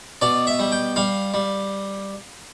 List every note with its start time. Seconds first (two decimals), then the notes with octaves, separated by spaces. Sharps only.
0.21 B2 D5
0.47 E5
0.59 G3
0.72 G5
0.96 G3 F5
1.34 G3